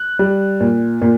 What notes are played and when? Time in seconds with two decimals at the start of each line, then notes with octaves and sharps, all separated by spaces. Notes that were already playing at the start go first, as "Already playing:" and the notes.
Already playing: F#6
0.19 G3
0.60 A#2
1.02 A#2